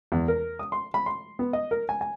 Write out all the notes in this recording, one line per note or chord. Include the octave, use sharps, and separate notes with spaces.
E2
A#4
D#6
C6
B5
C6
B3
D#5
A#4
G#5
G#5